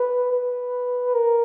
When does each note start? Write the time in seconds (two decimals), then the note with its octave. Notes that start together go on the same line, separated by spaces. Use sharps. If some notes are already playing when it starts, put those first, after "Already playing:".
Already playing: B4
0.31 B4
1.15 A#4